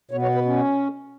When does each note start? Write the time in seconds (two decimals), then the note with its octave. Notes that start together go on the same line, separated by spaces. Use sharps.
0.11 B2 B3 C#5
0.22 C#5
0.35 B4
0.46 C#4